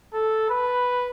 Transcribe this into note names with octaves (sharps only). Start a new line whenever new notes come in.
A4
B4